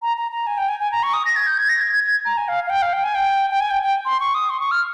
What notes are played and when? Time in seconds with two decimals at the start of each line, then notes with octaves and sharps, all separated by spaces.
0.02 A#5
0.17 A#5
0.31 A#5
0.47 G#5
0.58 G5
0.69 G#5
0.80 G#5
0.92 A#5
1.03 C#6
1.14 D#6
1.25 A#6
1.36 G#6
1.47 G6
1.58 G#6
1.69 A#6
1.81 G#6
1.93 G#6
2.04 G#6
2.25 A#5
2.37 G#5
2.48 F5
2.67 F5
2.70 G5
2.82 F5
2.93 G5
3.04 G#5
3.15 G5
3.50 G5
3.60 G#5
3.71 G5
3.83 G5
4.05 C6
4.20 C#6
4.35 D#6
4.50 C6
4.60 C#6
4.71 F6